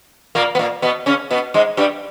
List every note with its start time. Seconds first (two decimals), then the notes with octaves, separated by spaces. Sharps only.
0.35 A#2 A#3
0.55 B3
0.59 A#2 A#3
0.82 B2 B3
1.06 C#3 C#4
1.31 B2 B3
1.54 G#2 G#3
1.77 G2 G3